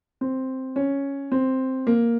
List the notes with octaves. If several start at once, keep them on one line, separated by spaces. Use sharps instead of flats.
C4
C#4
C4
A#3